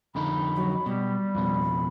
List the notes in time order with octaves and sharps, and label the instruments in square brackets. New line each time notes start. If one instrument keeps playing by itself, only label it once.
[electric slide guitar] F2 D3 D#4 [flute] B5
[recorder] F#3
[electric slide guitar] B2 [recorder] G3
[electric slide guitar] F2 B2 [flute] B5